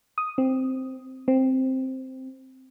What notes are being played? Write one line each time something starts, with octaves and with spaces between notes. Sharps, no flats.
D#6
C4
C4